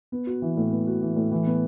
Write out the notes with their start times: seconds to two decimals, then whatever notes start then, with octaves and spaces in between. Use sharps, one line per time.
0.12 B3
0.27 F#4
0.42 E3
0.57 A2
0.72 B3
0.87 F#4
1.02 E3
1.16 A2
1.32 E3
1.46 B3